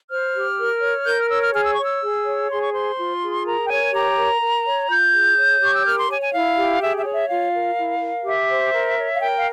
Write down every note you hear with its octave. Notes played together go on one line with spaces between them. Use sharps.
C5 F6
G4
A#4
C#5
A#4 G6
F6
C#5 E6
F6
G#4 F6
E6
C#5 C#6
E6
G#4
C#5
G#4 C6
C#6
C5 C6
F4
G#4
A#4 A#5
G5
C#5 G#5
G4 A#5
A#4
A#4
C#5
F4 G6
G#4
C#5
G4 C#6
E6
A#4 F6
C6
C#5 G#5
G#5
E4 F5
G4
G#4 E5
E5
C#5
E5
F4 F5
A#4
E4
A#4
G4 E5
C5
A#4
C#5
F5
A#4 G5
F5